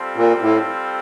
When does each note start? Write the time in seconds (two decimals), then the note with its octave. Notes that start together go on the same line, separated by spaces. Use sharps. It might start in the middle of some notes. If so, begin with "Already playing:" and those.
Already playing: G3 C4 F4 A4
0.16 A#2
0.41 A2